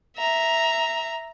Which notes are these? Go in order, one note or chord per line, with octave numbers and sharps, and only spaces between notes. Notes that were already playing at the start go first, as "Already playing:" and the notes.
E5 A#5